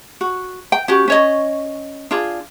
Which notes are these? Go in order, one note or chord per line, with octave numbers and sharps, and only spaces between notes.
F#4
G5
C#4 F#4 G4
C#4 C#5 D#5
D4 F4 G#4